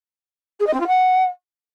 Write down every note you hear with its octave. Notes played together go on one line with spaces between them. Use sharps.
G#4
D#5
C4
F4
F#5